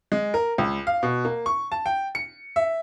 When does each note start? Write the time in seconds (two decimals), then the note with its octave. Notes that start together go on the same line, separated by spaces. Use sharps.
0.12 G#3
0.34 A#4
0.58 C#2
0.87 F5
1.03 B2
1.25 A#3
1.46 C#6
1.72 A5
1.86 G5
2.15 C#7
2.56 E5